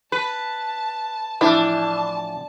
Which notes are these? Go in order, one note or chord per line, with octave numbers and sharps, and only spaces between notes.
B4 A5
A2 E3 F3 D4 E4 E5 A5